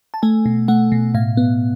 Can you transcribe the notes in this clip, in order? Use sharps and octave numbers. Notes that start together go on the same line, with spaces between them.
A5
A3 G#5
B2
A3 F#5
B2
A2 F5
B3